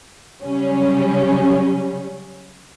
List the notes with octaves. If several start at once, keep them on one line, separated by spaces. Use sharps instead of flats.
C#3 F#3 G3 C#4